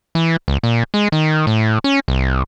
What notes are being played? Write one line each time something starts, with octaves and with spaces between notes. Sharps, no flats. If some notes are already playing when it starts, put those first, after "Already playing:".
E3
C#2
A#2
G#3
D#3
A2
C#4
C2